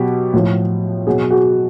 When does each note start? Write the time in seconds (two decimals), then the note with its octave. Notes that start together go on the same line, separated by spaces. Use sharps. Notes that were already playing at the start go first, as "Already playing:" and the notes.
Already playing: B2 F#3 G4
0.33 A2 F3
1.07 B2 F#3 F#4 G#4
1.30 F#4 G#4